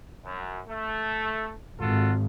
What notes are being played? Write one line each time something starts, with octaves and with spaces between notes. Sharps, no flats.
F#2
A3
G#1 F4 F#4 A4